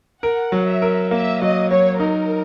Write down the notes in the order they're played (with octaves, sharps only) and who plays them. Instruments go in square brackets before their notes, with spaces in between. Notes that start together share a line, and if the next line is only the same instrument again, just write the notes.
[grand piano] A#4 [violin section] F#5
[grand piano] F#3
[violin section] E5
[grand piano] A#4
[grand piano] A#3 [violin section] E5
[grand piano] F#3 [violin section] D#5
[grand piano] F#3 [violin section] C#5
[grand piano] D#4 [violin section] A#4